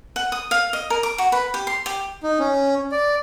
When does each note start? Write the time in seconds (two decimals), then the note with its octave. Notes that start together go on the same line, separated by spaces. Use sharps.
0.16 F#5
0.32 D#6
0.51 F5
0.73 D#5
0.90 A#4
1.03 D6
1.18 F#4
1.32 B4
1.54 G4
1.67 C6
1.86 G4
2.23 D#4
2.39 C#4
2.92 D5